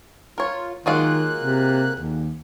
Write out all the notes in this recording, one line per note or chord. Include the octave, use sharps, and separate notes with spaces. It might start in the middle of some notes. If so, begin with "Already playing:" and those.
F4 A#4 C#5
D#3 F#3 G#3 A#3 F4 F#6
C3
D#2